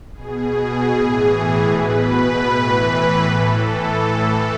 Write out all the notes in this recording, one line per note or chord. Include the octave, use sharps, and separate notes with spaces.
B2 G#4
A2 E3
B2 B4
A2 E3
A2 E3 A4
A2 E3